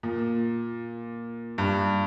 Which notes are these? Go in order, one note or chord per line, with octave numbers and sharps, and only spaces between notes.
A#2
G2